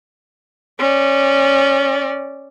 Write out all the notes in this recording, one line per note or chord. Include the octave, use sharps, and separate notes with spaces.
C#4 D5